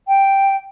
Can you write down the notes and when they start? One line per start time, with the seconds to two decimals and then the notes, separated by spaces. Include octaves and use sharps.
0.08 G5